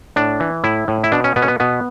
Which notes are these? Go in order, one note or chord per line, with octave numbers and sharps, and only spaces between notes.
A2 D4
E3
A2 E4
A2
E4
B2 D4
C#4
B2 B3
C#4
B3
B2 B3